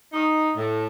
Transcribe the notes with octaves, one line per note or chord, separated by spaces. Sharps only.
D#4
A2